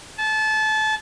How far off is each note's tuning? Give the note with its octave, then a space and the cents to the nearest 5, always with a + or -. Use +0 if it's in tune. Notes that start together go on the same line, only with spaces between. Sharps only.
A5 -25